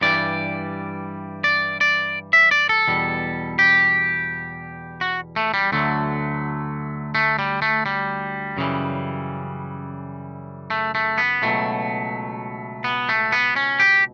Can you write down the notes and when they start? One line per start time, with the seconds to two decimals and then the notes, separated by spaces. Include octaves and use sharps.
0.01 G2 E3 G3 D5
1.44 D5
1.81 D5
2.33 E5
2.51 D5
2.69 A4
2.88 E2 B2 G3
3.59 G4
5.01 F#4
5.36 A3
5.54 G3
5.72 D2 D3 F#3 A3
7.15 A3
7.39 G3
7.62 A3
7.86 G3
8.57 F#2 C#3 E3 G3
10.70 A3
10.95 A3
11.18 B3
11.42 C#2 B2 F#3 A3
12.84 B3
13.09 A3
13.32 B3
13.56 C#4
13.80 G4